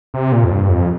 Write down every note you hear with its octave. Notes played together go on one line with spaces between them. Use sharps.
C3
A#2
F2
G2
F2